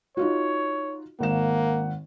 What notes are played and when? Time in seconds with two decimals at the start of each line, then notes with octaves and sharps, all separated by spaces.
0.17 D#4 F4 F#4 C#5
1.20 G#1 A#3 F#5 E7